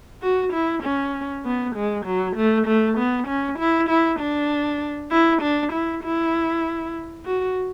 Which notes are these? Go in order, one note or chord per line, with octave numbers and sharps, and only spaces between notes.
F#4
E4
C#4
B3
G#3
F#3
A3
A3
B3
C#4
E4
E4
D4
E4
D4
E4
E4
F#4